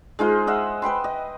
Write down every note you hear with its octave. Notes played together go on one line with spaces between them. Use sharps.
G#3 D#4 F4 C5
D#5 E5 F#5
B4 G5 B5 C6
D#5